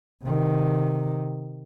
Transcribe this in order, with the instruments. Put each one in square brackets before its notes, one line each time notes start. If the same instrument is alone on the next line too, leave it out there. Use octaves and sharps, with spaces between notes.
[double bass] C3 D#3